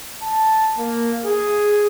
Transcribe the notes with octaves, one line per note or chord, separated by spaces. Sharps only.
A5
A#3
G#4